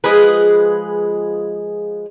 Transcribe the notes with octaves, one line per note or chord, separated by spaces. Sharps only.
F3 G#3 G#4 B4